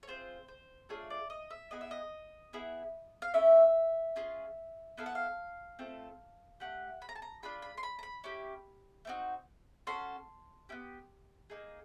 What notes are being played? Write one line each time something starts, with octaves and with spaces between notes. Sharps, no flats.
C#5
C4 F4 G#4 C5
C5
A3 D4 F4 G#4 C#5
D5
D#5
E5
B3 E4 G#4 D#5
E5
D#5
B3 E4 G#4
F5
A3 C#4 E4 E5
C#4 F4 G#4
B3 E4 A4 F5
F#5
F5
A3 C4 F4 A4
A3 D4 G4 F#5
B5
A#5
A5
A#5
D4 F4 G#4 B5
B5
C6
B5
A#5
B5
C#4 E4 G4
A3 C4 D#4 F#4
C#4 F#4 A4 C6
B3 E4 G4
A#3 D#4 G#4